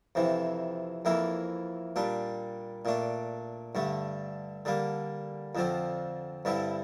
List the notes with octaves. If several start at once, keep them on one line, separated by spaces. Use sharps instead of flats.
F2 C3 E3
F2 E3 A#3 E4
A#2 G3 D4
A#2 A3 D4
G2 D3 A3
D3 G3 A#3
F2 D3 F3 C4
G2 D3 G3 C4 E4